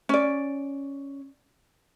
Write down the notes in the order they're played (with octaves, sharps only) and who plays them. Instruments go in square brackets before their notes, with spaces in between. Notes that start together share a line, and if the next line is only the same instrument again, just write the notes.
[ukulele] C#4 D5